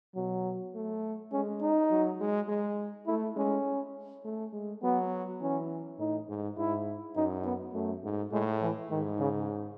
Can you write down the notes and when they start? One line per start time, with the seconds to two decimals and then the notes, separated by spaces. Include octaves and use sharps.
0.16 B2 F#3
0.75 A3
1.32 G#3 C#4
1.62 D#4
1.90 F#3
2.20 G#3
2.48 G#3
3.07 A3 E4
3.36 G#3 C#4
4.24 A3
4.53 G#3
4.83 F#3 B3
5.41 E3 C#4
5.99 A2 D#4
6.29 G#2
6.57 G#2 E4
7.16 F#2 D#4
7.45 B3
7.74 F#2 A3
8.03 G#2
8.32 A2 G#3
8.62 E3
8.91 G#2 D#3
9.19 C#3